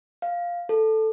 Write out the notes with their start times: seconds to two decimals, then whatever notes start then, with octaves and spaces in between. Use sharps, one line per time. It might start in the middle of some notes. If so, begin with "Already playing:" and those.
0.22 F5
0.69 A4